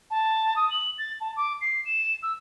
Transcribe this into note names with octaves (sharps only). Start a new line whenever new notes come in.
A5
D#6
F#7
A6
A5
D6
C7
E7
E6